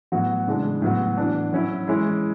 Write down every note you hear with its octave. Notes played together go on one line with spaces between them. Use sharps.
A2 F#3 B3 F#4
C#3 E3 G#3 D4
A2 F#3 B3 F#4
E3 B3 D4
F#3 C#4 E4
E3 G#3 C#4 E4